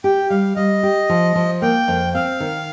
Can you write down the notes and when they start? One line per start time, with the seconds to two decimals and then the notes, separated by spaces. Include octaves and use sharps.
0.04 G4 G5
0.30 G3 F5
0.56 G3 D#5
0.83 G4
1.09 F3
1.36 F3
1.62 A#3 G5
1.88 F2
2.14 C4 F5
2.40 D#3